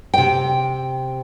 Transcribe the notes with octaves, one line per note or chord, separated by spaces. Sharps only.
C3 G5